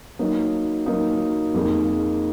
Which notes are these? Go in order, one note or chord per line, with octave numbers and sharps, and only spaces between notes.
F#3 A#3 D#4
F#3 A#3 D#4
F2 F3 A#3 D#4 G#4